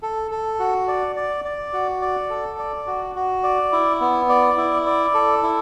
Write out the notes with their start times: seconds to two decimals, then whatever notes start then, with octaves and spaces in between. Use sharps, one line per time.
0.03 A4
0.31 A4
0.59 F#4
0.88 D5
1.16 D5
1.45 D5
1.73 F#4
2.02 D5
2.30 A4
2.58 D5
2.87 F#4
3.15 F#4
3.44 D5
3.72 E4
4.01 B3
4.29 D5
4.57 E4
4.86 D5
5.14 A4
5.43 E4